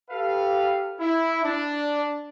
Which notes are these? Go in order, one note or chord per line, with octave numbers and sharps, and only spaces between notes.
G4 A4 B4 F5
E4
D4